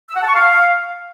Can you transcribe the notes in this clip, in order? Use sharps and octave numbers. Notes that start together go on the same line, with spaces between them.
E6
F#5
A5
C#6
F5